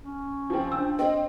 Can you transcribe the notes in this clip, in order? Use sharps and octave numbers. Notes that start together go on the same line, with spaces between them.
C#4
F3 C4
D4 E6
C4 D#5